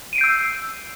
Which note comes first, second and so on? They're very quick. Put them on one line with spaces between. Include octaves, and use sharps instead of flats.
D#7 D7 C7 G6 E6